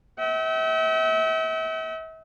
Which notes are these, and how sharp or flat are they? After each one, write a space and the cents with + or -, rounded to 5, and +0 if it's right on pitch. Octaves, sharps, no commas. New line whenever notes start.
E5 -40 G5 -40